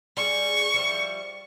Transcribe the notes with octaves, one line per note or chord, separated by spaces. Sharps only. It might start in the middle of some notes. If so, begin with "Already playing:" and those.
G3 G#4 C#6
F3 G3 E4